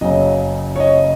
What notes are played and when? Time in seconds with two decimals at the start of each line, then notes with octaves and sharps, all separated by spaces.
0.01 F#1 F#2 C#3 F#3 D#5
0.76 C#5
0.80 D#5